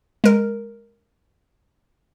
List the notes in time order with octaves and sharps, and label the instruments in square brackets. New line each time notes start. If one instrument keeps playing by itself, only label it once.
[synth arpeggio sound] G#3 A#4